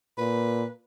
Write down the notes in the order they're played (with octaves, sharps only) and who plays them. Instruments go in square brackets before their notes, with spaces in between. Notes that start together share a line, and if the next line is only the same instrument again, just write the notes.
[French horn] A#2 [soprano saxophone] B4